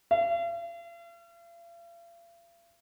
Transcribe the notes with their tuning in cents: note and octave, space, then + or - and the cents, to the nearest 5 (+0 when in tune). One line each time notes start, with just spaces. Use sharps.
F5 -45